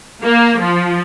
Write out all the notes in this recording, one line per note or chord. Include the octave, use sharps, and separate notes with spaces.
A#3
F3